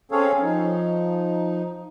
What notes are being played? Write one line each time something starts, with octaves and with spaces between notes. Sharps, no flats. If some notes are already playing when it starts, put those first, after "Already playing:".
C4 C#4 G#4 A4 C#5 F5
F3 D#4